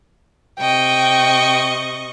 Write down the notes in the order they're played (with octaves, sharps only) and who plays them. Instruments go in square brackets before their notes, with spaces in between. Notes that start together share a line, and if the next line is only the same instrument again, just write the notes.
[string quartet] C3 D#5 C#6 [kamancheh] G5